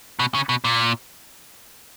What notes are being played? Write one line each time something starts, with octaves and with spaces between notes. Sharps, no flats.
B2
C#3
B2
A#2